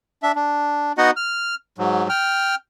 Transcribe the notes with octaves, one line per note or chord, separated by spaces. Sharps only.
D4 E5
D4
B3 D#4 F#4 D#5 F#5
F6
G#2 F#3
G5 F6